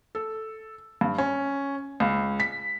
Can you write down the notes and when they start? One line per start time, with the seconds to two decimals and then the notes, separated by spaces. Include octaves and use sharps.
0.15 A4
1.01 G2
1.18 C#4
2.00 C#2
2.40 B6